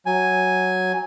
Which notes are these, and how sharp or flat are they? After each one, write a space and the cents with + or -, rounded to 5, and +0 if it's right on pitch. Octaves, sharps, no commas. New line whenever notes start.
F#3 +0 G#5 +0